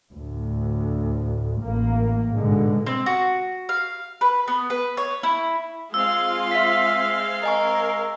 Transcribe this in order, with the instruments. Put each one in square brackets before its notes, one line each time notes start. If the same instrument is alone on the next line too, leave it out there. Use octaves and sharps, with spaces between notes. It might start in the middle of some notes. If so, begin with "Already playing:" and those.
[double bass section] D2 A2
A1 A#3
G#2 B2 D3 G#3
[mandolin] C4
F#4
F5
B4
B3
B4
C#5
E4
[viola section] G#3 C4 F5 [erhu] F4 [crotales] E6
[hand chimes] E5 B6
[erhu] A#4 [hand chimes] D#5 G#5 C#6